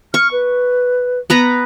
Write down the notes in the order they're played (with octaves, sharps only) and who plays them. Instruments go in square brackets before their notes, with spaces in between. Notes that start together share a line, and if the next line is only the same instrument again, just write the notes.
[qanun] C#6 [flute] F6
[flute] B4
[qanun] B3 B4 A#5